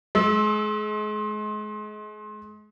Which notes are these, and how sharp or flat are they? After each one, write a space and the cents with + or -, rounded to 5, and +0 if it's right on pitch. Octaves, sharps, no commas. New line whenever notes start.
G#3 +35 E6 -15